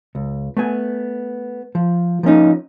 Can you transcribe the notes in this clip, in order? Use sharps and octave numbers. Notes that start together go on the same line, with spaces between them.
C#2
A3 B3 G#5
F3
F3 A#3 C#4 D#4